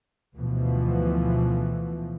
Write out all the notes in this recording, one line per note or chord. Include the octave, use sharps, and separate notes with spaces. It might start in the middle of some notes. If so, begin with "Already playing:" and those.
D2 B2 E3 F3